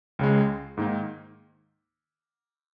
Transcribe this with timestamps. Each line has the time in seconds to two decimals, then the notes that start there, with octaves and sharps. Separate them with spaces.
0.19 C#2 C#3 G#3
0.77 G#2 D#3 A#3 D#4